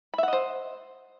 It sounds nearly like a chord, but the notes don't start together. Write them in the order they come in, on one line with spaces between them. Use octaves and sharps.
B5 E5 F#5 D#5 C5